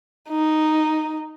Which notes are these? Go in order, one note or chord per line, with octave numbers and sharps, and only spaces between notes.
D#4